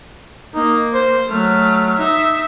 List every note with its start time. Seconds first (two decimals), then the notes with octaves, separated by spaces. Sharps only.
0.55 A#3 D#4
0.94 C5
1.28 F#3 A3 F6
1.98 D#4 E5